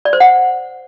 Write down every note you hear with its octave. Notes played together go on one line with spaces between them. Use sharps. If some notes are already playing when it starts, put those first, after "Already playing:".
D5
C5
F#5